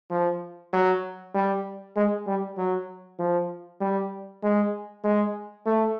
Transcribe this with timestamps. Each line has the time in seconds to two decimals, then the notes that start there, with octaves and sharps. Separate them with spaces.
0.10 F3
0.73 F#3
1.34 G3
1.96 G#3
2.27 G3
2.57 F#3
3.19 F3
3.81 G3
4.43 G#3
5.04 G#3
5.66 A3